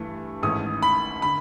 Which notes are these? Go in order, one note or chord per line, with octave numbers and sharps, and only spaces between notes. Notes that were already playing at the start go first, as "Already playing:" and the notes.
Already playing: G2 E3 A3
G#1 G#2 E3 A3 C#4 D#6
B5
D3 B5